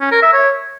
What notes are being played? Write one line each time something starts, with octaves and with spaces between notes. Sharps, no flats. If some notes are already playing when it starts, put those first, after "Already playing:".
C#4
A#4
E5
C#5